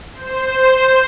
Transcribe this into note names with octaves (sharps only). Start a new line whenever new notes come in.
C5